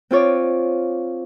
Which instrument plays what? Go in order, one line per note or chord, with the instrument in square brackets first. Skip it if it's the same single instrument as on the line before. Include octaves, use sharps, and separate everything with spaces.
[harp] C4 F4 C#5 D5